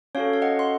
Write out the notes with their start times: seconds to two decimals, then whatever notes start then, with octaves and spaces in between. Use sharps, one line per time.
0.15 C#4 F#4 A4 C#5 F5
0.33 F5
0.42 D#5 F#5
0.59 C6